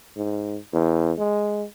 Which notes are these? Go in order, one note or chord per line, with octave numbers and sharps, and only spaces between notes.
G#2
E2
G#3